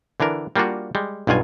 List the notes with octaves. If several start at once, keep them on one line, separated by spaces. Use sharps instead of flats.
D3 E3 D4 A#4
G3 A#3 D4 F4 F#4
G3 G#3
B1 G2 B2 F4 G#5